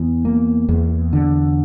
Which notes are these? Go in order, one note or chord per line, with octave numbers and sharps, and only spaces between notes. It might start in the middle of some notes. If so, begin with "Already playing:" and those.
Already playing: E2
A#3
E2
D3